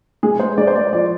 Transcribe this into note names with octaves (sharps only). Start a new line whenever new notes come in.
G#3 G#4
C5
G#3 D5
C5
D5
F3 D5